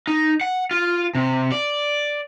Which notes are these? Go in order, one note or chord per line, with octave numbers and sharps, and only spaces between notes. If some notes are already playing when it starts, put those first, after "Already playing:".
D#4
F#5
F4
C3
D5